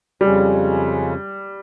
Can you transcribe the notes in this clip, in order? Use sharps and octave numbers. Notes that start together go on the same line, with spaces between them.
F2 C#3 G3 G#3 C#4